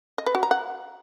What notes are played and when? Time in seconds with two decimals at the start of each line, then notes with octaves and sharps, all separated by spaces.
0.18 D#5
0.26 B4
0.35 F#4
0.43 A#5
0.51 F#5